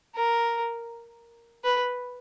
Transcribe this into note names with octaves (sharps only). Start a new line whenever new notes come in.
A#4
B4